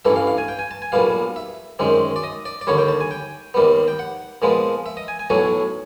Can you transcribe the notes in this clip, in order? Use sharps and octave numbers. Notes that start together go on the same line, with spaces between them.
A1 G2 E3 A3 E5
F5
F5
G#5
G5
G#5
A5
G#5
B1 A#2 G3 B3 F5
E5
F#2 D#3 G#3 C4
D5
D#5
D5
D5
D#2 D3 G3 C#5
G5
A5
G#5
G5
D#2 D#3 G3 B3
G5
F#5
A#2 F3 G#3 B3
E5
D#5
G#5
G#5
B1 A2 F#3 A3 G#5